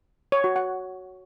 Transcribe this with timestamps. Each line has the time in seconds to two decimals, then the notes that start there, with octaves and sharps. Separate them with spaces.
0.32 C#5
0.44 F#4
0.56 F#5